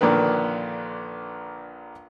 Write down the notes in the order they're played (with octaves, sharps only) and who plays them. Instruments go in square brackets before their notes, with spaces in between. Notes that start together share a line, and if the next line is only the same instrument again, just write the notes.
[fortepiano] A#1 A#2 D3 D#3 B4